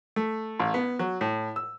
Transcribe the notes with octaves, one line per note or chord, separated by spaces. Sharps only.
A3
A1
B3
F#3
A2
E6